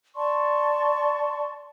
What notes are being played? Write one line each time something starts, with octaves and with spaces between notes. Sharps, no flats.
D5 A5 C6 C#6